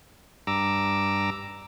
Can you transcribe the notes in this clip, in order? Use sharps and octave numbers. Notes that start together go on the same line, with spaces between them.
G2 A#5 D6 E6